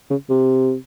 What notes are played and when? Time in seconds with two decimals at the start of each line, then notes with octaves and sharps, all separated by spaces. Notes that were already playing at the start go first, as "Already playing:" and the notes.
0.10 C#3
0.29 C3